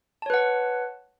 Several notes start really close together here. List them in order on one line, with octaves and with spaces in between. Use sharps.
A5 C#5 B4 F#5